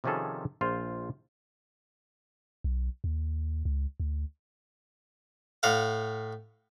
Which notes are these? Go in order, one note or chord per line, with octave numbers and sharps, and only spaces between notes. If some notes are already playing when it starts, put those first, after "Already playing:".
C3 D#3 F3 C#4 G#4 A4
A#1 F4 C5
B1
D#2
C#2
D2
A2 F5 F#5